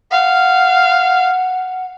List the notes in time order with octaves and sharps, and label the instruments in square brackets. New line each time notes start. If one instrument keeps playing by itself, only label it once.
[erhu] F5 [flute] F#5